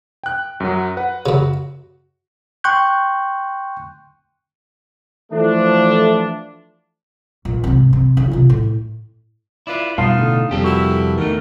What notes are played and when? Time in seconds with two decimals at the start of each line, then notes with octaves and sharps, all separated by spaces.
0.23 G5 F#6
0.60 F#2 F#3
0.97 B4 F#5
1.26 F#2 C#3 F#4
2.64 G5 C6 C#6 F#6 G6
5.32 E3 F3 A3 D4
7.45 A#1
7.64 G#2 C3
7.93 C3
8.17 C#3
8.31 C3 F4
8.50 A2
9.67 E4 F4 B4 D5
9.98 G2 B2 D#4 F4 F5 A5 C6
10.15 A2 D3
10.51 F2 C3 G3 G4 A4
10.64 A#2 E4 F#4 B4
11.18 E2 D#3 A3 A#4